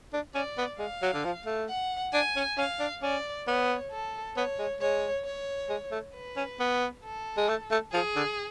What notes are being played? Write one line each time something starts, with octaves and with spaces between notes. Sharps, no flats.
D4
C#4 D5
B3
G#3 F5
F#3
D3
F3
A3
F#5
D4 G#5
C#4
C#4 F5
D4
C#4 D5
B3 C#5
A4
B3 C#5
G#3
G#3 C#5
C#5
G#3
A3
B4
C#4
B3
A4
G#3
A3
A3
F3 G#4
D3